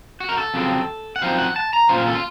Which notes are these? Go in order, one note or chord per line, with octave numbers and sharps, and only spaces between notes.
F#4
A#4
A4
F2 C#3 F#3 C4
F#5
F#2 F3 C4 D#4 F5
F#5
A5
A#5
A#2 A3 C#4 F4 C5
A#4
A4
F4